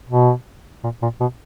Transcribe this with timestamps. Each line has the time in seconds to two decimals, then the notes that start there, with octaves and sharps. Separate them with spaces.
0.10 B2
0.84 A#2
1.02 A#2
1.20 B2